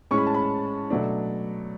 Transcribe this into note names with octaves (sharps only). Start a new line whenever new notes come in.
A2 G#3 C#4 C#6
B5
A5
B5
B2 F#3 A3 D4